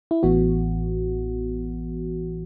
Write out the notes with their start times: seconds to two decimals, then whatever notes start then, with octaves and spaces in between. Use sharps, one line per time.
0.11 E4
0.23 A1 A2 E3 B3 F#4